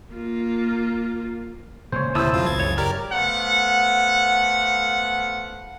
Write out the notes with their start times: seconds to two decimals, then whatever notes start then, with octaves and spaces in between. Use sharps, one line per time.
0.13 A#3 F4
1.92 A#2 C#3 G#3 C5 C#5
2.15 D2 C3 E4 C5 A5 D#6 E6
2.34 A1 F2 F#3 C4 F4
2.46 C#2 G#6 A6
2.60 F#1 F#2 C#5
2.78 G4 A#4 C#5 D5 A#5 F6
3.12 A3 B3 C5 F5 F#5